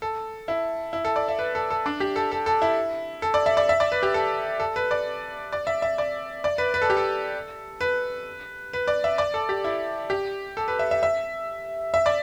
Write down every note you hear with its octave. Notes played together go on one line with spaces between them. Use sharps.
A4
E4
E4
A4
D5
E5
B4
A4
A4
D4
G4
A4
A4
A4
E4
A4
D5
E5
D5
E5
D5
B4
G4
A4
A4
B4
D5
D5
E5
E5
D5
D5
B4
B4
A4
G4
A4
B4
B4
D5
E5
D5
A4
G4
E4
G4
A4
B4
E5
E5
E5
E5
D5